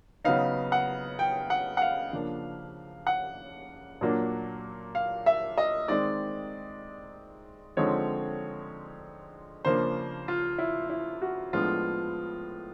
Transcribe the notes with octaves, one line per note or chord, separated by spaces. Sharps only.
C#3 F#3 B3 D#4 F5
F#5
G5
F#5
F#5
F5
C#3 F3 A#3 D4
F#5
A#2 F#3 A#3 D4
F5
E5
D#5
D#3 G#3 C4 D#4 D5
D3 F3 G#3 C4 D#4 C#5
C#3 F3 A#3 D4 C5
F4
E4
E4
F#4
A2 F3 G#3 B3 D4 F4